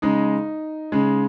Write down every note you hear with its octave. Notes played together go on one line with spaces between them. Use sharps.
C#3 G#3 D#4
C#3 G#3